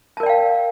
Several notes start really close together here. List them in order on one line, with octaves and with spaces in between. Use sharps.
A5 A#4 D5 G5 F5